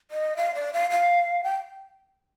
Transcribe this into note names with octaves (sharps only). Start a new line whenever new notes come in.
D#5
F5
D5
F5
F5
G5